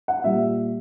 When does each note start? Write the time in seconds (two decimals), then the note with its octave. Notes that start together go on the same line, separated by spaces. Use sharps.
0.08 F#5
0.24 A#2 G3 E5